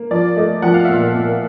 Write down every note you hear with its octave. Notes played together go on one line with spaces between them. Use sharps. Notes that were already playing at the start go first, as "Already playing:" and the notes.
Already playing: A#3
F3 D5
A3 D#5
F3 F#5
F5
A#2 E5
F5
A#2